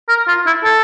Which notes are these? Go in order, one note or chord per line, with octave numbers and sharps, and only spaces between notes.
A#4
F4
E4
A4